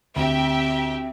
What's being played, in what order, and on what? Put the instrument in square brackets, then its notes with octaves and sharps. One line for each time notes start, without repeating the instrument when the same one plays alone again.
[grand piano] D2 [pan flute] C4 [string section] G4 E5